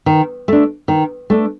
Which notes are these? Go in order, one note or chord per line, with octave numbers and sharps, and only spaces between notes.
D#3
A3 D4
D#3
A3 D4